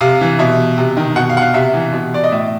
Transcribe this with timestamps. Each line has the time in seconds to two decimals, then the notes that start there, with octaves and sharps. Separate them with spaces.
0.01 C3 F5
0.21 E3
0.39 B2 E5
0.78 C3
0.97 D#3
1.16 B2 F#5
1.29 F5
1.37 F#5
1.42 F5
1.54 C3 E5
1.74 E3
1.92 B2
2.14 D5
2.24 D#5
2.31 A2 E5